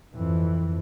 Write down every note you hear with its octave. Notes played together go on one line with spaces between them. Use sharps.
F2 E3